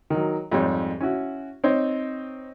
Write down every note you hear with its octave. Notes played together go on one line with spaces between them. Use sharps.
D#3 F#3
F2 G#2 G3 C#5
C#4 E4 F#4
C4 D#4 C5 C#5